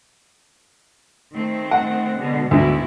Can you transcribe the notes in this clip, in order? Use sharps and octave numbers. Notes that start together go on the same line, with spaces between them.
D#3 A3 C4
F#5
B2 D3 G#3
D2 G#2 B2 D3 E4